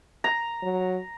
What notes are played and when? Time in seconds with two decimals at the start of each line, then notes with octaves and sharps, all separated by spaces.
0.24 A#5
0.63 F#3